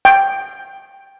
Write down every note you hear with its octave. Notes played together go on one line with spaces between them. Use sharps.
G5